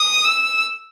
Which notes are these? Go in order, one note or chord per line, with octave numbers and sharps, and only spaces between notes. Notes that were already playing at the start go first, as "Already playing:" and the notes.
Already playing: D#6
E6